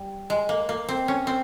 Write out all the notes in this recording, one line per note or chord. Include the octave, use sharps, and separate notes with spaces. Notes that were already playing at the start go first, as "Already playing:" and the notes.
Already playing: G3
G#3
A#3
A#3
C4
C#4
C4